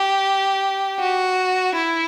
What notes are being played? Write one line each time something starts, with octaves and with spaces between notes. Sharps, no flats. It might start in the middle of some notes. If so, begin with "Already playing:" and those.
Already playing: G4
F#4
E4